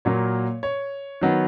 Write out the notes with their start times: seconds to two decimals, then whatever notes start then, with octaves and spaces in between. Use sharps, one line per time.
0.05 A#2 F#3 A#3 C#5
0.63 C#5
1.21 D#3 F#3 B3